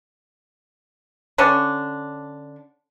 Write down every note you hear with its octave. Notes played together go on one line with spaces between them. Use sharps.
D3 C#4 D4